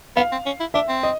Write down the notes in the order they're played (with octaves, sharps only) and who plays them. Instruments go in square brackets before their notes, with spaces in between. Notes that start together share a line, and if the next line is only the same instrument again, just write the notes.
[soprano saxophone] B3 [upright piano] F5
[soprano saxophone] C4
C#4
E4
[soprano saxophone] D4 [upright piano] E5
[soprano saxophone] C4
[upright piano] D#5